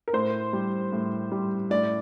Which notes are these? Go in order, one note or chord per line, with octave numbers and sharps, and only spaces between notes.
A#4
A2 C5
G3
A2
G3
A2 D5